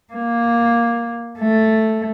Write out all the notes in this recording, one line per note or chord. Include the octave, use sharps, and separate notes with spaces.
A#3
A3